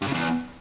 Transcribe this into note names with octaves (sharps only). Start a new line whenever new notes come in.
G2
C#3
E2